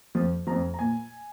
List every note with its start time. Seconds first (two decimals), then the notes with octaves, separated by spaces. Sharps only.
0.15 F2 F3
0.47 F2 F3 A#5
0.74 A#5
0.79 A#2 G#5